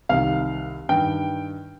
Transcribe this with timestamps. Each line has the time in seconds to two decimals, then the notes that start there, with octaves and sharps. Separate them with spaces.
0.09 C2 C3 D#3 F5
0.89 G2 D#3 G5